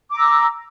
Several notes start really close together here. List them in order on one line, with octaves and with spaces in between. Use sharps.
D6 A#5 E6